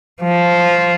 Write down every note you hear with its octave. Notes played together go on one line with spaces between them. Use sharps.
F3